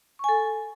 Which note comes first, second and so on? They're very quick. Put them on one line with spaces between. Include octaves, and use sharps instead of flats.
C#6 G#5 A4